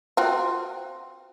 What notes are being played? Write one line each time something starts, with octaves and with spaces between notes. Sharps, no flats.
C4 F4 F#4